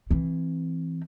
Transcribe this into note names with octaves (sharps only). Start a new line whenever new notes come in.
E3 C4